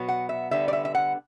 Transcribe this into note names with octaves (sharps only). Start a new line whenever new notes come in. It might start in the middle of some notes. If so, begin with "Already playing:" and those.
Already playing: B2 F#3 B3
F#5
E5
D3 G3 B3 E5
D5
E5
E5
F#5